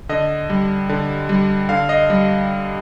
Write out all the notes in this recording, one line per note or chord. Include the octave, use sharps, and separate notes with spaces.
D3 D#5
G3
D3
G3
D3 F5
D#5
G3